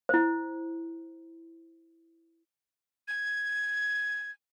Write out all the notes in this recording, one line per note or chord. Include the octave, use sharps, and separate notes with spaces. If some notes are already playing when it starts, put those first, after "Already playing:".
E4 C5
G#6